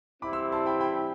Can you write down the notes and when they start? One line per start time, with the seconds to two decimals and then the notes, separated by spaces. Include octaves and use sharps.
0.22 E3 G3 C4 E4 B5 D6
0.33 C6 E6
0.52 A5 C6
0.66 G5 B5
0.80 G5 B5